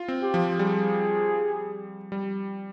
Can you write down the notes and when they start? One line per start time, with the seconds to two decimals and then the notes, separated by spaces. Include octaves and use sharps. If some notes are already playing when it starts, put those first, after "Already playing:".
Already playing: F4
0.08 C4
0.22 G4
0.34 F3
0.59 G3 G#4
2.12 G3